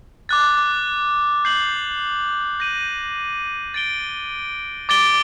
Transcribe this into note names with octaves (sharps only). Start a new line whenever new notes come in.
D6 F#6 A6
G6 C7 F#7
G6 A#6 D#7 F#7
A6 D7 G7
D6 A6 D7 G7